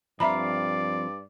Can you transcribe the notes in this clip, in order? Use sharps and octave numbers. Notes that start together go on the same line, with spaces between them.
G2 F3 C4 D5 E5 F5 A#5 B5